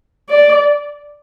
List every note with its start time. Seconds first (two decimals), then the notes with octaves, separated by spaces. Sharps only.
0.30 D5